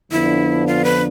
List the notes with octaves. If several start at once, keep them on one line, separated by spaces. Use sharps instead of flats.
F2 D3 F3 B3 D4 E4
F4
B4